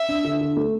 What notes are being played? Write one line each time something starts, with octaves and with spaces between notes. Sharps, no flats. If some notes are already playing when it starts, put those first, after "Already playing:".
Already playing: E5
D4
D3
D3
A3